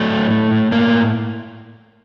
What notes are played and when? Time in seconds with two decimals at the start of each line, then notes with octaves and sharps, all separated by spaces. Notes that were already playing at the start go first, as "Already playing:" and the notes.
Already playing: F#3 A3
0.10 A2
0.31 A3
0.51 A2
0.71 A2 A#3